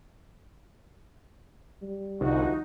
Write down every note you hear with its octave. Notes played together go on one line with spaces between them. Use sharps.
G3
C2 D3 F3 D#4 F#4